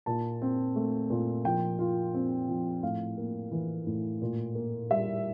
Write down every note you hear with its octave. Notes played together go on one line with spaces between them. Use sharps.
A#2 A5
C4
A3
A#2
F3 G5
F4
C4
F3
A2 F5
A#3
E3
A2
A#2
A#3
G3 E5